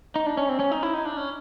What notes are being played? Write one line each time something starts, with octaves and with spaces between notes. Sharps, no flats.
D#4
D4
C#4
C4
C#4
D#4
E4
D#4
D4
C#4